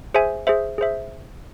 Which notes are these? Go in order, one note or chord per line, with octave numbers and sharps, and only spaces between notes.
G#4 C5 E5 G#5
G#4 C5 E5
G#4 C5 E5